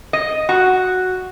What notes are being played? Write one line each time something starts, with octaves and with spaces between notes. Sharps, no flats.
D#5
F#4